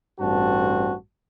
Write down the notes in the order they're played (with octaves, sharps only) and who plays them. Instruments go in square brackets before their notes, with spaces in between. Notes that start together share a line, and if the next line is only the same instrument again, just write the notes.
[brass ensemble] A1 G2 C4 F#4 A5